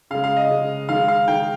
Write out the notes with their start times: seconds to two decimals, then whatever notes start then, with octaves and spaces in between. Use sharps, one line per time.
0.11 C#3 F5
0.15 G#3
0.24 F5
0.37 D#5
0.50 C#3 G#3
0.89 D#3 G#3 F5
1.08 F5
1.28 D#3 G#3 G5